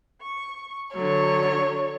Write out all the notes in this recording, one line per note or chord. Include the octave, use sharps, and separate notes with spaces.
C#6
D3 F#3 C#5